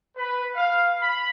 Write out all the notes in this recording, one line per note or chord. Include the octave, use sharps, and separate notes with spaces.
B4
F5
B5